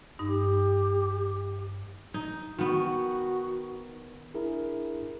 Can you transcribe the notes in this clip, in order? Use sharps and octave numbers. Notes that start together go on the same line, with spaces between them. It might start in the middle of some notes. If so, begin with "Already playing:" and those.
G2 D#4 G4
D#4
D#3 B3 F#4
D4 E4 G#4 A#4